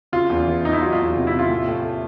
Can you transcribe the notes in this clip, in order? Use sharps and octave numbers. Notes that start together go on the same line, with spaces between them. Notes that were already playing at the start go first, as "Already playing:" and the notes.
C#3 F4
E2
E3
C#3 D#4
E4
F#3 F4
F4
E2
C3
E4
C3
F4
A2
A2
A3